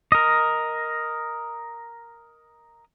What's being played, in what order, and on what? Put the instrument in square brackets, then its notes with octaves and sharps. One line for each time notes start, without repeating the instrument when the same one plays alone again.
[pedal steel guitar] A#4 D#5